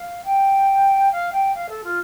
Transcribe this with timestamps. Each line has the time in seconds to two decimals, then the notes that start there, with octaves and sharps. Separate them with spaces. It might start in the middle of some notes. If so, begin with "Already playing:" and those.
Already playing: F5
0.24 G5
1.11 F5
1.32 G5
1.54 F5
1.69 A4
1.84 F4